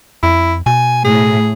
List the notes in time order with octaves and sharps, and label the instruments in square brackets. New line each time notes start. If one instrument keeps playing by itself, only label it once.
[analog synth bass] F2 [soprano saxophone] E4
[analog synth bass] B2 [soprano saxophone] G#5
[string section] A2 [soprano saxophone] G#4